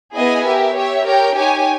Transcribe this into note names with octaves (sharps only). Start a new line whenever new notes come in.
B3 E4 G#4 D#5 G#5
G4 A#4 E5
G4 C#5 E5
G4 A#4 C#5 G5
D#4 G4 C#5 G#5